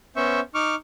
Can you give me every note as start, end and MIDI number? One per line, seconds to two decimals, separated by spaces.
0.16 0.40 59
0.16 0.40 61
0.16 0.40 72
0.16 0.40 76
0.16 0.40 85
0.55 0.75 63
0.55 0.75 85
0.55 0.75 86
0.55 0.75 89